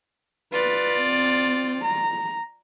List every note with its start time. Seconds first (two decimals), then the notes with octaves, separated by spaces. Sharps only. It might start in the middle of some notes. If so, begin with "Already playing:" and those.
0.53 F4 B4 D5
0.99 C4
1.85 A#5